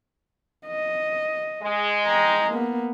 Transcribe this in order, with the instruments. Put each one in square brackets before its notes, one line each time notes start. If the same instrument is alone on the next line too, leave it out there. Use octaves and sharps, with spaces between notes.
[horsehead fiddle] D#5
[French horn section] G#3
[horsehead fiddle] G5 A#5
A#3 B3